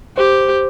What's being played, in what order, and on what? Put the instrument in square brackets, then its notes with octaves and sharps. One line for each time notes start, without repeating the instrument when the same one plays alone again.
[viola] G4 [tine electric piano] C5